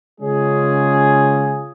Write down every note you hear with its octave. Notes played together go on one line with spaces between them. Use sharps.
C#3 G#3 C#4 F4 G#4